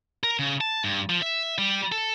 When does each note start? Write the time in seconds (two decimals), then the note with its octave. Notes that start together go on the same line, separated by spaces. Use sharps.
0.24 A#4
0.39 C#3
0.61 A5
0.84 G2
1.09 F3
1.22 E5
1.58 G3
1.92 A4